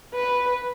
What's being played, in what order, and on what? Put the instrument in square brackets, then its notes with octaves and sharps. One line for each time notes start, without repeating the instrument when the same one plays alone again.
[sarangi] B4